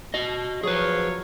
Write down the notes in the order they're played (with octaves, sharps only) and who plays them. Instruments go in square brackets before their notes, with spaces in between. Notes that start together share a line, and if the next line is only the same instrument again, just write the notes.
[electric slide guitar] F#4 D#5
[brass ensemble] F3 F#3 C#5 [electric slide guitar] G#4 B4